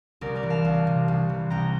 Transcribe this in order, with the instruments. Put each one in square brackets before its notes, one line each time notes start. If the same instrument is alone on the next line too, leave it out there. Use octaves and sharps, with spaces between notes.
[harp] C2 A#4 D5
A#4 D5
E3
F5 A5
C2
C3
C2
E3
C2 G5 A#5